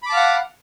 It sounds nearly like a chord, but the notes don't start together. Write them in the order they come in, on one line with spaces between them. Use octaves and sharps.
B5 D6 A5 F5 F#5